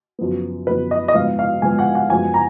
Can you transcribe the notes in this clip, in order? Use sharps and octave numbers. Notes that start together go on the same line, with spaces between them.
F#2 F3 B3
F#2 F3 B3 B4
D#5
D#5
G#2 F3 B3 F5
F5
G#2 F3 B3 G#5
F#5
F#5
F#2 F3 G#3 B3 G#5
A#5